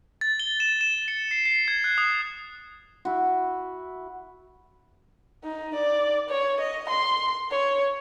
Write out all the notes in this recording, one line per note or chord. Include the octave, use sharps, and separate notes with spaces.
A6
G7
E7
E7
C#7
C7
C7
G#6
F#6
D#6
E4 F#4
D#4
D5
C#5
D#5
C6
C#5